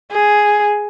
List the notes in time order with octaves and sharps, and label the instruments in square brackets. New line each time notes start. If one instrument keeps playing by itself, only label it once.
[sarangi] G#4